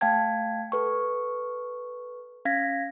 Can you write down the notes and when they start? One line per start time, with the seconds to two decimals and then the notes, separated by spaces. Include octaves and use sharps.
0.01 A3 F5 G5 A5 G#6
0.72 A4 B4 C#6
2.45 C#4 F5 G#6 A#6 B6